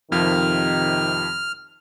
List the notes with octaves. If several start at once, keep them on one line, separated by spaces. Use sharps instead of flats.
F2 C3 D#3 F3 F6